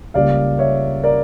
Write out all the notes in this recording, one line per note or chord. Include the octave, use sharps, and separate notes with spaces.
C#2 C#3 G3 A#3 D5 F5
C#5 E5
A#4 D5